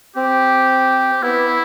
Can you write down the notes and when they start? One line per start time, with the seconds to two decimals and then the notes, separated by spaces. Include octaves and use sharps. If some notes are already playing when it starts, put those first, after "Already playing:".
0.16 C4 G4
1.22 B3 E4